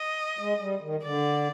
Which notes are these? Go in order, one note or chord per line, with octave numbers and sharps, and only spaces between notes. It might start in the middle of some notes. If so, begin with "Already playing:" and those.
Already playing: D#5
G#3
G3
D#3
D3 D5